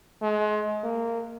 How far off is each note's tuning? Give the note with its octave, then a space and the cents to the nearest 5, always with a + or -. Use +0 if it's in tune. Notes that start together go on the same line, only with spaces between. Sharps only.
G#3 +30
A#3 -15